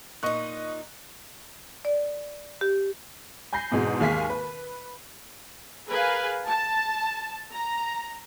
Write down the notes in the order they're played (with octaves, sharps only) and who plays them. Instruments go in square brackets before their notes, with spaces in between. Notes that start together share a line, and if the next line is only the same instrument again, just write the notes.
[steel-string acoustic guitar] A#2 D#4 [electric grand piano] D#5 C#6 F#6
[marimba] D5
G4
[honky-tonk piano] G#5 B5 G6 A#6 C7
E2 G#2 B2 G#3
D#2 G#3 F5 G#5 B6
B4
[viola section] G#4 A#4 B4 F5 G#5
A5
A#5